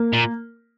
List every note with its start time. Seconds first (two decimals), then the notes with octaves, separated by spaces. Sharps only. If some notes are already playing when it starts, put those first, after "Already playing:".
Already playing: A#3
0.13 A#2